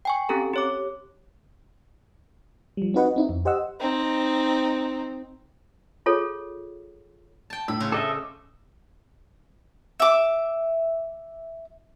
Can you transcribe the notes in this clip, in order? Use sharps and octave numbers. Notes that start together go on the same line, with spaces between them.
G5 G#5 C#6
C4 C#4 G4 A4 A#5
G4 C#5 D6
F3 G3
C4 D#4 F#4 B4 D#5 F#5
C4 D#4 E4
F2
G4 C5 D#5 F#5 E6
C4 D#4
F4 G#4 A4 C#5
G5 A5
A2 B5 E6
C#3 C5
A4 D#5 E5 D6
E5 D6